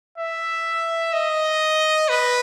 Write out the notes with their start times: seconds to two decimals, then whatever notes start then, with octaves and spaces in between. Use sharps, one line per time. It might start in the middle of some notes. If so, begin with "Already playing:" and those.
0.18 E5
1.13 D#5
2.09 B4